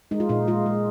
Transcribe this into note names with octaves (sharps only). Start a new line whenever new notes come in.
G#3 D#4
F4
A#2 D#4
G#3 F4
G#3